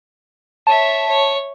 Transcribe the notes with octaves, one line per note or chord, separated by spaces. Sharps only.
C#5 E5 A5
C#5